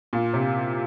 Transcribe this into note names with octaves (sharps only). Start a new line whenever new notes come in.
A#2
C3